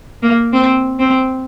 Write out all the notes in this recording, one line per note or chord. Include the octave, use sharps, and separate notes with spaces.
A#3
C4
C4